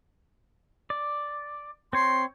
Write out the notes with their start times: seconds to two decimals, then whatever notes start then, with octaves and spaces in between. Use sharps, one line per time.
0.90 D5
1.93 C4 C#5 C6